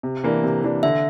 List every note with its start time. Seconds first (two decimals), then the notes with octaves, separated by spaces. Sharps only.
0.03 C3
0.24 E3 A#3 D4
0.44 C3
0.63 E3 A#3 D4
0.83 D3 E5